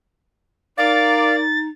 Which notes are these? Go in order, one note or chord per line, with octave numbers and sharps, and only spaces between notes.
D#4 A#4 D5 F5 A6